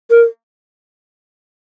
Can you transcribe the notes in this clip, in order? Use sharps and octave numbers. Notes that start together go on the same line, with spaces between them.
A#4